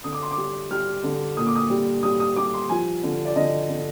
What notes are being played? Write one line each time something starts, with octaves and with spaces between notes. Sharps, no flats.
D3 D#6
D6
C6
D6
G3
G3 F6
D3
A#2 D#6
D6
D#6
G3
G3 D#6
D#6
G3 D6
C6
F3 G#5
D3
D5
D3 D#5
D3